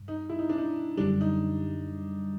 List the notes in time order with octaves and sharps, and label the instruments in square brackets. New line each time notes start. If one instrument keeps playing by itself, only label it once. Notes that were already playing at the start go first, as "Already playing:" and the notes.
Already playing: [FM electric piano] G2
[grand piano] D#4
E4
D#4
D4
D#4
[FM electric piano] F#2 D3 G3 [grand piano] D4
[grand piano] D#4